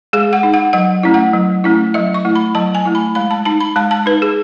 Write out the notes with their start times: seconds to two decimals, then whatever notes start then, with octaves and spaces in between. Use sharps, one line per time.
0.13 G#3 G#4
0.33 F#5
0.43 D#4
0.54 F#5
0.73 F#3 F#5
1.03 A3 C#4 E4
1.14 F#5
1.34 F#3
1.64 A3 C#4 E4
1.94 F#3 E5
2.14 C#6
2.25 A3 E4
2.35 B5
2.55 F#3 A5
2.75 G#5
2.85 A3 E4
2.95 B5
3.15 G#3 B5
3.31 A5
3.45 D#4 A5
3.61 B5
3.76 G#3 A5
3.91 A5
4.06 D#4 B4
4.22 G#4